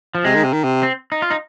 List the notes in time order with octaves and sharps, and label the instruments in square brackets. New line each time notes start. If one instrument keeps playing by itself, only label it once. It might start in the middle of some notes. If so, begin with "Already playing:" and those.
[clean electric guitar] F3
[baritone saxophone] C3 [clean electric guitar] G#3
[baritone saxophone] D#3
C3
D#3
C3
[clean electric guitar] C4
D#4
F4
D#4